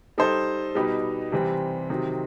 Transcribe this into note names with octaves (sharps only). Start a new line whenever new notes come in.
G3 D#4 A4 C5
B2 G3 D#4 G4 B4
C3 E3 G3 C4
C3 D#3 F#3 C4 D#4